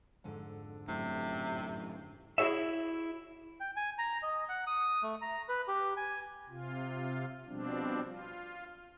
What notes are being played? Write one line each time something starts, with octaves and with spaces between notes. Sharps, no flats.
F2 G#2 D3
F#2 A2 C3
E4 F#4 G#4 C#5 E5
G5
G#5
A#5
D#5
F#5
D#6
A3
A#5
B4
G4
G#5
C3 F4
B2 F3 G3 C4 D4
F4